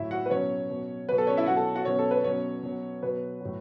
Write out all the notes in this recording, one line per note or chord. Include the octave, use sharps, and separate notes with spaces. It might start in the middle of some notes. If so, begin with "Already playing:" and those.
Already playing: A2 F#3 E4 E5
F#4 F#5
B4
B2 F#3 C#4 C#5
B2 F#3
B2 F#3 B4
A4
C#4 C#5
E4 E5
B2 F#3 F#4 F#5
A4 A5
F#4 F#5
B2 F#3 C#4 C#5
A4
B4
B2 F#3 C#4 C#5
B2 F#3
B2 F#3 B4
A2 F#3